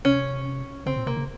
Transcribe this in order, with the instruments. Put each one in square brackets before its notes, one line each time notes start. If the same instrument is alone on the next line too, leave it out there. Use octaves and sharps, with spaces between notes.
[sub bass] C3 [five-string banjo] C#4
[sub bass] C#3 [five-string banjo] C4
[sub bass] A#2
[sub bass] C3 [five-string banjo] A#3
[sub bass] C#3